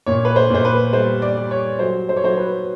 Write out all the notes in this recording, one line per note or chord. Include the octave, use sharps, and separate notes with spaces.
A#2 C#5
B4
C5
A#2 C5
B4
G3 C5
D5
G3
C#5
F#3 C5
C5
C#5
F#3 C5
B4